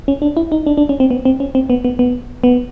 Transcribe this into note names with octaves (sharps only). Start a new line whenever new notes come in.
C#4
D4
E4
D#4
D4
D4
C#4
C4
B3
C4
C#4
C4
B3
B3
B3
B3